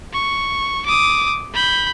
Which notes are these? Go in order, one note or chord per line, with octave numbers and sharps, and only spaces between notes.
C#6
D6 D#6
B5 G6